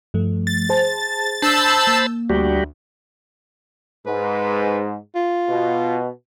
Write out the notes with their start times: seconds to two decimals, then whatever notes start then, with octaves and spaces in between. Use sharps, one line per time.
0.14 G2 F3 A3
0.47 A6
0.69 G#4 C5 A5
1.42 D4 C5 A5 B5 E6 G6 A6
1.87 A#3
2.29 D2 G3 F#4 G4
4.06 G#2 B4
5.15 F4
5.49 B2